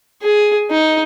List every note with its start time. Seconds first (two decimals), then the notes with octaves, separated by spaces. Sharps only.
0.22 G#4
0.71 D#4